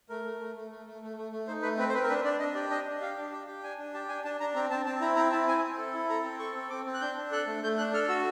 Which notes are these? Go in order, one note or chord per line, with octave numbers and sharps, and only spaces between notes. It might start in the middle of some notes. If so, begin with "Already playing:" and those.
A3 A#4
A3
A3
A3
A3
A3
A3
A3
A3
D#4 C5
A3 B4
C4 B4
C5
C4 B4
A#4
D4 B4
D4 D5
D4 D#5
G4 D5
D4 D#5
D4
G4 F5
D4
G4
G4
D4 G#5
D4
G4 A5
D4 G#5
D4 A5
D4 A#5
C4 A#5
C4 A5
C4 A5
E4 A#5
C4 A#5
E4 A5
C4 G#5
C4
A4
E4
A4 A#5
C4
A4 C#6
C4
C4 D6
C4
F#6
D4 G6
D4
A4 F#6
A3
A3 G6
D4 F#6
A4 F6
F#4 E6